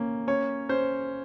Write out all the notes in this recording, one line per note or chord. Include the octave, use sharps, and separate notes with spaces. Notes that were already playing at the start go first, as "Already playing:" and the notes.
Already playing: A#3 C#4
C#4 C#5
C#4 C5